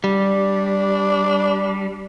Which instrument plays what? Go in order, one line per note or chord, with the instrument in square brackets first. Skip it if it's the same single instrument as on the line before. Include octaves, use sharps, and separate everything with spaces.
[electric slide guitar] G3 [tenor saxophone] D4